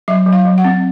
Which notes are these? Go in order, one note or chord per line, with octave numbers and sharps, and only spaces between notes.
F#3 E5
F#3
F5
F#3
F#5
C4